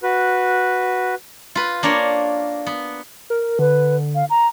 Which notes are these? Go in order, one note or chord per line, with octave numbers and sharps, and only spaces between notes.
F#4 B4
F4 B4
A#3 D4 A#4 C#5
B3
A#4
D3 B4
F5
A#5